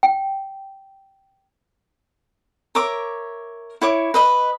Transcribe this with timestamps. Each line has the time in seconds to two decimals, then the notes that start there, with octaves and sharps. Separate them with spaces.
0.03 G5
2.75 A#4 C#5 E5 D6
3.81 E4 C#5 D6
4.14 B4 D#5 B5